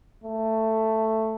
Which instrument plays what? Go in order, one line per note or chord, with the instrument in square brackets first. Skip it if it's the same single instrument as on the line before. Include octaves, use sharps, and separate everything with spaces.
[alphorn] A3